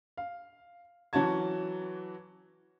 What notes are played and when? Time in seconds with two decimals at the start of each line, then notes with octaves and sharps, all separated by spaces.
0.17 F5
1.13 E3 F#3 C#4 F#4 A5 G#6